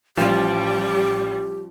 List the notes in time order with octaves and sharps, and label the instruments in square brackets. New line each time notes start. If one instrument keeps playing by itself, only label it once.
[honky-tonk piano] A1 [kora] F3 F4 [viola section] G3 [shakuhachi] G4